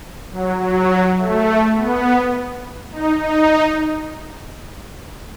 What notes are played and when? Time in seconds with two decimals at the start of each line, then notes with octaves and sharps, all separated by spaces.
0.31 F#3
0.60 F#3
1.18 A3
1.75 B3
2.92 D#4
3.21 D#4